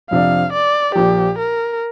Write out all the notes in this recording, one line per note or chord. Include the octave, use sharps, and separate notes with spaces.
F2 C3 F3 D4 F5
D5
A#1 A#2 F3 G4
A#4